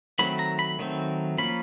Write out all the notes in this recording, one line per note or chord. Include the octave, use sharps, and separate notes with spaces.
D#3 F#3 A3 C4 B5
A#5
B5
D#3 F#3 A3 C4
F3 A#3 C#4 B5